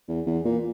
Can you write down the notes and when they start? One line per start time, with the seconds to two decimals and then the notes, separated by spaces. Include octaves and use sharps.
0.08 E2
0.26 E2
0.45 A#2